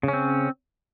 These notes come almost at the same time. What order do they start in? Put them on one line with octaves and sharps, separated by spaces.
C#3 C#4 C4